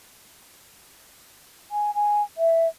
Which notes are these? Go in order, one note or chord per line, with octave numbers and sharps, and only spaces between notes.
G#5
G#5
E5